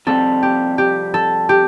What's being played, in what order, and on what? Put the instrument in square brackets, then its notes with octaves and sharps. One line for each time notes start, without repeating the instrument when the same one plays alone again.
[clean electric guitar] F2 C3 G3 [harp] A4
[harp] G4
G4
A4
G4